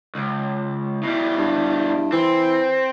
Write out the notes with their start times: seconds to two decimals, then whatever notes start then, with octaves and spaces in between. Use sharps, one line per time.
0.15 C#2
1.03 B2 G3 E4
1.38 G2
2.12 E3 C4 C5